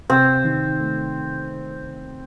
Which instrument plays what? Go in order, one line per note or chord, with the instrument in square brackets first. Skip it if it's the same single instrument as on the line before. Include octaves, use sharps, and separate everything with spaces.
[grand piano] C3 [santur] C4
[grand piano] D#3
A3